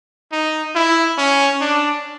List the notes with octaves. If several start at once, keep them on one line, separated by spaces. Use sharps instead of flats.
D#4
E4
C#4
D4